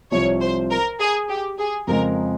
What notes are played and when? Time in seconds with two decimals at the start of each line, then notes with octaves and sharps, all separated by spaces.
0.12 C2 C3 F3 C#5
0.41 C5
0.70 A#4
1.00 G#4
1.29 G4
1.58 G#4
1.87 F2 C#3 G#3 A#4